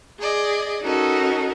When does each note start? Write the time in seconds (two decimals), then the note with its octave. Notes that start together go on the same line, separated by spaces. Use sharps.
0.19 G#4 D5 D#5
0.81 C#4 D#4 F#4 A4 A#4